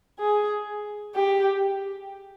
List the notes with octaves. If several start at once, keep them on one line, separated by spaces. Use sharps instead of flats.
G#4
G4